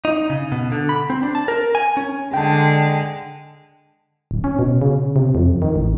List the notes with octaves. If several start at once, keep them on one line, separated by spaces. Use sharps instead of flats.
D#4
C#3
B2
D3
B5
C4
D4
A5
A#4
G#5
C#4
D3 G#3 G5 A5
D1
C#4
B2
C#3
C3
F2
D#3
A1